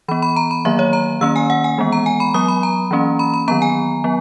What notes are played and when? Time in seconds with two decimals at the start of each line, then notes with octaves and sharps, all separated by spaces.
0.08 E3 B3 B5
0.22 B5
0.36 A#5
0.51 B5
0.65 D#3 F#3 A#3 E5
0.79 C#5
0.93 A#5
1.21 D#3 A#3 C#4 E6
1.36 G#5
1.50 F#5
1.64 G#5
1.78 E3 G#3 B3
1.92 A#5
2.06 G#5
2.20 B5
2.34 F#3 B3 D#6
2.48 B5
2.63 A#5
2.91 E3 A#3 C#4
3.19 B5
3.34 B5
3.48 D#3 F#3 B3 A#5
3.62 G#5
4.04 F#3 B3